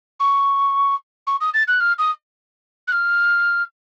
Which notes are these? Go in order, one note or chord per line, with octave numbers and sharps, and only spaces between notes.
C#6
C#6
D#6
A6
F#6
F6
D#6
F#6
F6